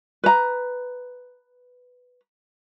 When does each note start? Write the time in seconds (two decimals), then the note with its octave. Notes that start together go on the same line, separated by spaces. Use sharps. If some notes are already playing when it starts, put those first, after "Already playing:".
0.24 B4 A#5